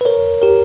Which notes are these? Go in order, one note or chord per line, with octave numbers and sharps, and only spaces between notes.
B4
A#4 C#5
G4 A#4